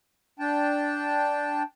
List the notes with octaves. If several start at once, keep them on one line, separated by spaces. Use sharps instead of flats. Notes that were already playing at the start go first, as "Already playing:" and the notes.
D4 G5 A5